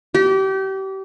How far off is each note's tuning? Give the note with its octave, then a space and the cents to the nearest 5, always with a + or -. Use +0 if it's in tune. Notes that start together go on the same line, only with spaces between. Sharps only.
G4 -30